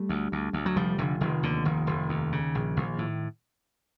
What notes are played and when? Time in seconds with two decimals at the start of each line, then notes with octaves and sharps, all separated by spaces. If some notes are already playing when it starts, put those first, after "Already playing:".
Already playing: G3 A3
0.09 D2
0.32 D2
0.53 D2
0.66 F#3
0.76 F1 F3 G3
0.98 F1 D3
1.21 F1 D#3
1.43 D#2 D3
1.65 F1 D#3
1.87 F1
2.09 D#2
2.32 C#3
2.55 A#1
2.77 A#1
2.98 A2